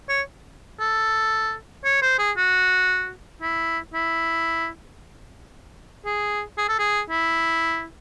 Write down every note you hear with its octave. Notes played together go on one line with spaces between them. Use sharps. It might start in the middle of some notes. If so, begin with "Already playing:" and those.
C#5
A4
C#5
C5
G#4
F#4
E4
E4
G#4
G#4
A4
G#4
E4